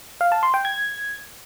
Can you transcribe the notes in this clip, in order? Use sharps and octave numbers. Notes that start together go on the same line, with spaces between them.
F5
A5
C6
G5
G#6